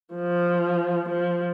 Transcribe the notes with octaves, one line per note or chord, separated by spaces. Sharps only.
F3
F3